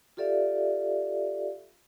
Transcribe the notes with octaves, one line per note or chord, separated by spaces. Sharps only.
F4 G4 A4 D5 E5 F5